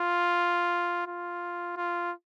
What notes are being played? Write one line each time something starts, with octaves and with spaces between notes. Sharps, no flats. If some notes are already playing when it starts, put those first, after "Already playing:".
Already playing: F4
F4
F4